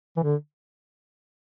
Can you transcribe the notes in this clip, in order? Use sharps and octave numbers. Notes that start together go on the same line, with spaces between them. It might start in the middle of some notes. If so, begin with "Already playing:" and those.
E3
D3